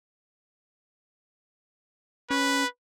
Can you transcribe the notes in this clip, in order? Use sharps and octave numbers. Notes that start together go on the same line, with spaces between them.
C#4 B4